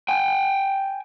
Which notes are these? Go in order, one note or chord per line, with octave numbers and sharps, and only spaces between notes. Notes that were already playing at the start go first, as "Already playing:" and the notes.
G5 G#5